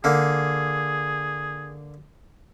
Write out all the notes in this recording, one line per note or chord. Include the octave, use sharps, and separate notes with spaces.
D3 A#3 G#4